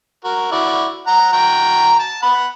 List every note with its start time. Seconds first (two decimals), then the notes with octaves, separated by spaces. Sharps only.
0.24 F#4 A#4
0.52 E4 F#4 D5
1.07 F#5 A#5
1.33 F#4 G5 A#5
2.00 A5
2.22 F#5 B5